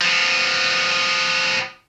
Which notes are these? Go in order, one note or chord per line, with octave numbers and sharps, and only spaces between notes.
F3 B3